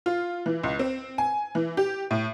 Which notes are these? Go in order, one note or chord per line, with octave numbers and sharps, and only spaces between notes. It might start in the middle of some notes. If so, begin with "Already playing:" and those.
F4
E3
C#2
C4
G#5
E3
G4
A2